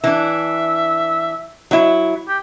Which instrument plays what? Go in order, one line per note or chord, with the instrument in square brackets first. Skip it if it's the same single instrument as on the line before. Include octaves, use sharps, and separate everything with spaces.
[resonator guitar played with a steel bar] E3 D4 [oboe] E5
[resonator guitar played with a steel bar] F#3 E4
[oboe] G4